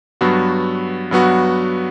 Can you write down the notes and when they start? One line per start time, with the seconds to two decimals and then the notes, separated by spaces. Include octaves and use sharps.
0.21 G2 F#3 B3 F#4
1.11 G2 F#3 B3 F#4